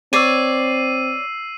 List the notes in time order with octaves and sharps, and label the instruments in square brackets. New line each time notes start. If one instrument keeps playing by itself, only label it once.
[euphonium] C4 [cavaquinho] C#5 D5 [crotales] E6 C7 D#7